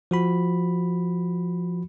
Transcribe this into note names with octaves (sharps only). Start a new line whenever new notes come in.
F3 F#4 B5